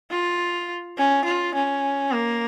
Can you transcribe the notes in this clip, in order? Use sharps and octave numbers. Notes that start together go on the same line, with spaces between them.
F4
C#4
F4
C#4
A#3